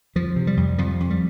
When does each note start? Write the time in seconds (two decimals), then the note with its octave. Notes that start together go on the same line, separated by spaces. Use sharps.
0.15 F2 F3
0.36 C3
0.47 G3
0.57 F2
0.78 F2 F3
1.00 F2
1.10 G3